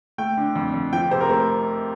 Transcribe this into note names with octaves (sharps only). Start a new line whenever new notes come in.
A3 G5
D3
F2
F2
F3 G5
C3 C5
A#4
A3 C5